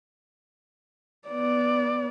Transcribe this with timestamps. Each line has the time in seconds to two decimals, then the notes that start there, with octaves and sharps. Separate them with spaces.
1.28 B3 D5